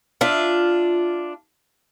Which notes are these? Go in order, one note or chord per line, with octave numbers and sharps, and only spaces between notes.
D4 F4 E5